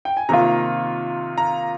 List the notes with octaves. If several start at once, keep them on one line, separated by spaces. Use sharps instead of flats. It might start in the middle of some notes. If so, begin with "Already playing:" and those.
G5
G#5
C3 D#3 A#3 F4 A#5
A#5